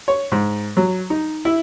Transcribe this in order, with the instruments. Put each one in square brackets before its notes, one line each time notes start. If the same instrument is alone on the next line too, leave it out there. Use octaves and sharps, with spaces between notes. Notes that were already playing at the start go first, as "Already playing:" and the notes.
[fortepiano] C#5
G#2
F#3
D#4
E4